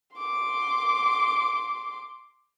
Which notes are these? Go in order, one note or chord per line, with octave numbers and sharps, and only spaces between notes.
C6 D6